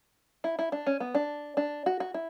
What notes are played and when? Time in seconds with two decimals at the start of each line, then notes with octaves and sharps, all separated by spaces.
0.44 E4
0.59 E4
0.72 D4
0.86 C#4
1.00 B3
1.15 D4
1.57 D4
1.86 F#4
2.00 F#4
2.14 E4